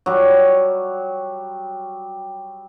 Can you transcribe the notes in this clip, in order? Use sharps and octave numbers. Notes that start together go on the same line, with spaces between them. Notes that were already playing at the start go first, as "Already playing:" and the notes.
F#3 G3